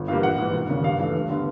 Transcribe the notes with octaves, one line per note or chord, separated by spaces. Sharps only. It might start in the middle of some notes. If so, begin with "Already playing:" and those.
Already playing: G1
G2 E3 G3 A#3 F5
A#1 F#5
G#2 E3
E1
D#2 C#3
G2 F5
E3 A3
G2
D3 G3 B3